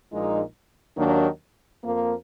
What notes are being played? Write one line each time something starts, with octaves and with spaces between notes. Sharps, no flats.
A#1 A#2 G#3 D#4
D#2 D#3 F#3 A#3 D4
F2 F3 A#3